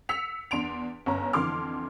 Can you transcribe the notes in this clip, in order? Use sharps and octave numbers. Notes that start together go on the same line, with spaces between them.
E6 B6 C#7 F7
E2 D4 C6 D7 F7
G1 C#4 A#5
F2 D3 E3 C6 D6 F6